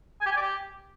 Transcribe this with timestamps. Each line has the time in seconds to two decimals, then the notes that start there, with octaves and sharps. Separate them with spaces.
0.21 G#5
0.26 G4
0.31 G#5
0.36 D5
0.41 G4